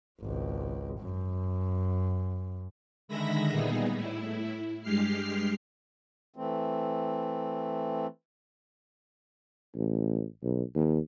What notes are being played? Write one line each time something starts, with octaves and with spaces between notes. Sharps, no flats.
G#1 C#2
F#2
D3 D#3 G#3 E5 B5 A#6
A#2 G3 B3 D#4 G#4
A2 E4
G2 G#3 G4 F6 C7
E3 A3 C4
A1
B1
D#2